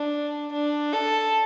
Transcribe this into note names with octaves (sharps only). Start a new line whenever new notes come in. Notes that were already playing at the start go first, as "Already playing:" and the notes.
Already playing: D4
D4
A4